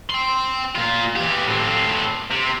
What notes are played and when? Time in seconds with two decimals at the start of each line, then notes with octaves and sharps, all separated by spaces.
0.10 G5 C6
0.75 A#2 F4
1.16 E3 G4
1.48 A2 C4
2.30 C3